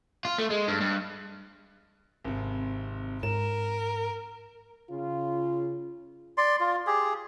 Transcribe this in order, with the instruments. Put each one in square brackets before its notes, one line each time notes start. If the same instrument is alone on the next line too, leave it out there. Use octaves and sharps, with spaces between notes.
[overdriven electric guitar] F4
A3
G#3
G2
G2
[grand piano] G#1 C3
[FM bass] G#2 [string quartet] A#4 [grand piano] E7
[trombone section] C#3 F4
[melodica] D5 C6
F4
G4 G#4